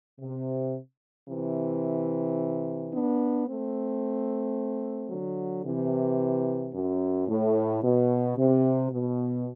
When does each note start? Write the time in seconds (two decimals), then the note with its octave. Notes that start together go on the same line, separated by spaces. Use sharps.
0.20 C3
1.29 C3 E3
2.92 B3 D4
3.46 A3 C4
5.10 D3 F#3
5.64 C3 E3
6.73 F#2
7.28 A2
7.82 B2
8.37 C3
8.91 B2